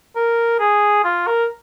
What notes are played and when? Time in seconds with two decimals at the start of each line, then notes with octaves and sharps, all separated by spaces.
0.16 A#4
0.60 G#4
1.04 F4
1.27 A#4